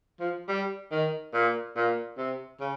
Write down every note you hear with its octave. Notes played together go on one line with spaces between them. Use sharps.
F3
G3
D#3
A#2
A#2
C3
C#3